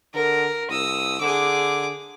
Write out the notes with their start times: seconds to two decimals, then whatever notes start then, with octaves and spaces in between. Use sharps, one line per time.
0.14 D3 A#4
0.70 C2 D#6 E6
1.21 D3 G#4 D6